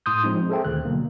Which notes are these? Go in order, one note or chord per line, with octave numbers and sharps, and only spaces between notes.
A2 C6 D#6 G6
F3 G#3 C4 D#4
G#4 A4 C5 E5 G5
D2 A#2 D#3 F#6
B2 D3 F#3 A#3